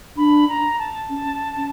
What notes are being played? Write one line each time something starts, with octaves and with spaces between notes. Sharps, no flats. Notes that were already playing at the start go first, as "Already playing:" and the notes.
D4 B5
A#5
A5
C#4
C#4